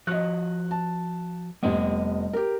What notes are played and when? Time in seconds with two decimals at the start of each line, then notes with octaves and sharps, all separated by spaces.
0.07 F3 F#4 D#5 F#6
0.71 A5
1.63 F1 G3 B3 D#5
2.33 G4 A#4